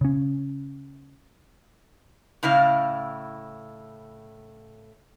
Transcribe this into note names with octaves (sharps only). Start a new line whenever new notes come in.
C#3 C#4
A2 C#3 E4 F5